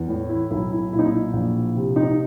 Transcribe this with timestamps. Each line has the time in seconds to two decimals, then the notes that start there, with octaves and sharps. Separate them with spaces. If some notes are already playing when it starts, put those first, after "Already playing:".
Already playing: E2
0.08 A2
0.29 E4
0.51 B1 E4
0.71 E4
0.93 A#2 E4
0.99 D#4
1.06 E4
1.33 A#1
1.76 C3
1.96 D#4